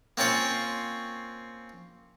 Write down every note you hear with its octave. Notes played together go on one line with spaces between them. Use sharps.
A#3 C4 C#4 F4 C#5